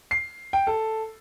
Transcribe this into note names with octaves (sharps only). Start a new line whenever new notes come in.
C7
G5
A4